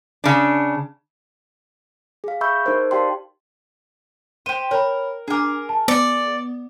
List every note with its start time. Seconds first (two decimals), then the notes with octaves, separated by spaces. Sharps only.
0.24 C#3 D4
2.24 G#4 F5
2.41 G#4 E5 B5 C#6 E6 G6
2.66 D#4 A#4 C5
2.91 G4 D5 F5 G5 A5 C6
4.46 G4 C5 D#7
4.71 A#4 C#5 B5
5.28 D4 G#4 A#4 D6
5.69 A5
5.88 B3 D5 C#7